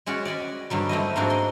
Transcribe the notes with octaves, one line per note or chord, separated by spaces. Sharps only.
G#3 C#4 F#4 C#5 D5
D5 D#5 G#5 B5
G2 D3 F#3 G3
A3 C4 E4 D#5
G#2 F3 A#3 C4 D4 F#4
D#5 C6